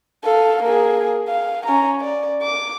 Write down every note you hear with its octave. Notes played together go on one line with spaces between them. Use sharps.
A4 F5
A#3 G#4
F5
C#4 A#5
D5
D6